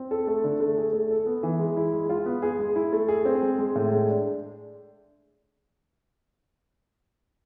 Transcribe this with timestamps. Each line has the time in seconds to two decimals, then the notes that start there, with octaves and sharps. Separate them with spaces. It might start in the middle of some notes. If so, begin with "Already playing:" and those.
Already playing: C4
0.11 A4
0.27 A3
0.44 D3
0.60 A3
0.77 G#4
0.93 A3
1.10 A4
1.26 B3
1.43 E3
1.59 G#3
1.77 E4
1.93 G#3
2.09 F4
2.26 B3
2.42 G#4
2.59 G#3
2.76 E4
2.93 A3
3.08 G#4
3.25 C4
3.42 G#3
3.58 G#3
3.75 A2
3.92 G#3
4.09 D4